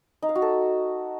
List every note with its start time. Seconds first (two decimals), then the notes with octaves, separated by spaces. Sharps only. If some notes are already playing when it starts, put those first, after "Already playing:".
0.22 D#4
0.29 F5
0.35 F#4
0.42 A4